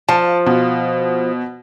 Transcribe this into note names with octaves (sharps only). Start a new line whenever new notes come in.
F3 A5
B2